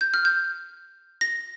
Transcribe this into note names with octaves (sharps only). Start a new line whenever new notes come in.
G6
F6
G6
A#6